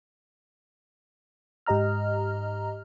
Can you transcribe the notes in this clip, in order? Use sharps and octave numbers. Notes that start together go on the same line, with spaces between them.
G#2 G4 D#5 A#5 F6